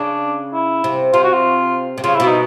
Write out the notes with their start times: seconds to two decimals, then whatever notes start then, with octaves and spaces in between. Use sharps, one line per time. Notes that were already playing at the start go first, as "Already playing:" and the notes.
Already playing: C#3 D4
0.54 E4
0.84 C3
1.13 C3 F4
1.24 F#4
1.34 F4
1.98 C3
2.04 C#3 F4
2.15 B2 E4
2.27 D#4